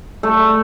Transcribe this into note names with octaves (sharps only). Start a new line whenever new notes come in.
A3